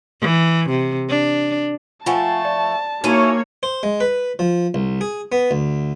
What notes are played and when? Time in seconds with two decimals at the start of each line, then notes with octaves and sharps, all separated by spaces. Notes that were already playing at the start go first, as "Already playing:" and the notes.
0.21 E3
0.70 C3
1.09 D4
2.06 F3 A3 F4 F#5 G#5 A5
2.45 D5
3.04 A#3 C#4 D#4 E4 F#4 C#5 D#7
3.63 C5
3.83 G#3
4.00 B4
4.39 F3
4.74 C2
5.01 G#4
5.32 B3
5.51 D2